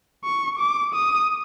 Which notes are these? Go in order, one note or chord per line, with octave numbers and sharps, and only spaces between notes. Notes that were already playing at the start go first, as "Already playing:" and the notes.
C#6
D6
D#6